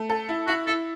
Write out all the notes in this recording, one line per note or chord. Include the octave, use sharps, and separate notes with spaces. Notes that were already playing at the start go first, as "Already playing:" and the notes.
Already playing: A3
A4
E4
E4 F#4
E4 A4